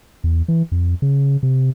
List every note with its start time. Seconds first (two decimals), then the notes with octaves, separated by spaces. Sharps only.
0.24 E2
0.48 E3
0.72 F2
1.02 C#3
1.43 C3